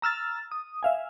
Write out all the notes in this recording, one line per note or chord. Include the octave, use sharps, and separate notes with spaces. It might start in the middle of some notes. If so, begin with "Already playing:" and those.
A#5 E6 F6 A6
D#6
E5 F5 G#5